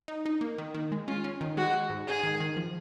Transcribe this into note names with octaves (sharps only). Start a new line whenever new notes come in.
D#4
D#4
A#3
D#3
D#3
G#3
C#4 F4
C#4
D#3
G#3 F#4
G#3
G#2
G#2 G#4
D#3
D#3
F3